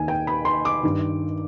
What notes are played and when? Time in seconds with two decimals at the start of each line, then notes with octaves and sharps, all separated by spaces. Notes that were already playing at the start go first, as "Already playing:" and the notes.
Already playing: D#2 D#3 G#5
0.08 G5
0.27 B5
0.45 C6
0.65 D6
0.83 G2 D#3